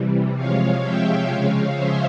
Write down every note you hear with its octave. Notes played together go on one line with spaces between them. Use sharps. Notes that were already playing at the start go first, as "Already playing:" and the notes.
Already playing: C3 E3 G3
C3 F3 G#3 C#5 F5
E5 G5
C#3 F3 G#3 C#5 F5
C5 E5